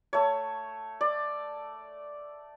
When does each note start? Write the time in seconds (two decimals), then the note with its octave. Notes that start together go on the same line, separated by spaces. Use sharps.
0.13 A3 C#5
1.01 D5